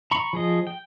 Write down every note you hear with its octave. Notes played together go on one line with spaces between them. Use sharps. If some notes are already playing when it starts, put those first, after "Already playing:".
A#5 B5 C#6
F3 G#4 D#5
G5